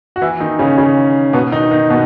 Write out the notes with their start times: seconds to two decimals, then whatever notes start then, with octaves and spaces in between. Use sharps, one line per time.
0.16 F#4
0.22 E3 E4
0.40 D#3 D#4
0.59 C#3 C#4
0.78 C#3 C#4
1.33 B2 B3
1.52 D#3 D#4
1.71 D#3 D#4
1.90 B2 B3